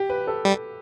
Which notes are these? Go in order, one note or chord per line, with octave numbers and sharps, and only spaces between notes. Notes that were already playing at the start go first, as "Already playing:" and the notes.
Already playing: G4
B4
A4
G3